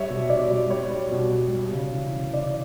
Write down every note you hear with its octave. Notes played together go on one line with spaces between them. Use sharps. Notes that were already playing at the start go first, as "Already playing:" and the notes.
Already playing: G3 C#5 E5
B2
B2 D5
G3
G3 C#5
G3
B2
G3
G3
C#3
E3
C#3
E3 D5